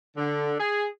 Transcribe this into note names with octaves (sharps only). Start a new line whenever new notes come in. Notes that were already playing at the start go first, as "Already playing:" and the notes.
D3
G#4